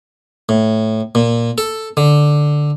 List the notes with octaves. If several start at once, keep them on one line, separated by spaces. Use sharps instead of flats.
A2
A#2
A4
D3